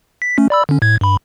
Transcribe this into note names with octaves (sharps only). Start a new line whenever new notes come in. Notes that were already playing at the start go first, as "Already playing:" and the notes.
B6
A3 C#4
D5 B5 E6
D3 C#4
A2 G#6
G2 B5